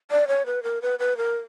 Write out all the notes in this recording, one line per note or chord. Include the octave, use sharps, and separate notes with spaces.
D5
C#5
B4
A#4
B4
B4
A#4